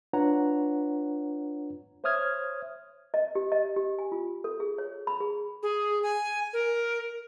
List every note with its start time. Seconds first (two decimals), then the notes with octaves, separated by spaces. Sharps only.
0.13 D4 F4 B4 C#5 F#5 A#5
2.04 C5 C#5 E5 D#6 F6 G#6
3.14 D#5
3.35 G4
3.52 D#5
3.76 G4
3.99 G#5
4.12 F4
4.44 A4
4.60 G#4
4.78 C#5
5.07 B5
5.20 G#4
5.63 G#4
6.03 G#5
6.53 A#4